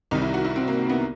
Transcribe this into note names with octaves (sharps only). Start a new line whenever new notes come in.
C2 C3 D#3 G3 D#4
E4
F#4
E4
C4
A#3
B3